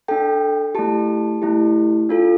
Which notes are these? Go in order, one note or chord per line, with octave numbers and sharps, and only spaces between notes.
D4 A4 G5
A3 E4 G4 A5
A3 E4 G4
D4 F4 A4